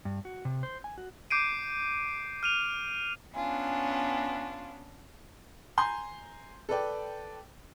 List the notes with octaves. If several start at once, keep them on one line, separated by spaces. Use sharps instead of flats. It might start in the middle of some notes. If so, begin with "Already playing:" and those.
G2
F#4
C3
C5
G#5
F#4
D6 G6 C7 D7 D#7
F6 D#7 F7
B3 C#4 D4 F4 G#5
G#5 A#5 C6 G6
A4 B4 D5 G5